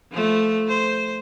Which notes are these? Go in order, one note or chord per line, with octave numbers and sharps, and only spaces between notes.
F3 A3
C5